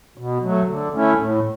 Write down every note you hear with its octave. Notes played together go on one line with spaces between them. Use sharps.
B2
F#3 A3
D3
A3 C#4 E4
A2